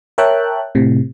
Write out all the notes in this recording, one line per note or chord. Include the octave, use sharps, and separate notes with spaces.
A#4 C#5 E5 G5 A5 F#6
A2 C3